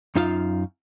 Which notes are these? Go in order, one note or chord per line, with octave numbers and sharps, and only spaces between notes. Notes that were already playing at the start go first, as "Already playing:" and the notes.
F#2 D#4 F4 E5 F5